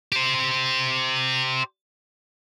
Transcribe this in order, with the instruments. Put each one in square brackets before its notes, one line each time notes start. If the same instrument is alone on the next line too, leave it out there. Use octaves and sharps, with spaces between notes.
[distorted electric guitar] G4 C5